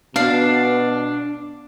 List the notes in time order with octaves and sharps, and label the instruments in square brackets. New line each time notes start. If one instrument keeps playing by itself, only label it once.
[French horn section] B2 [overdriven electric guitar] D4 [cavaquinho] F5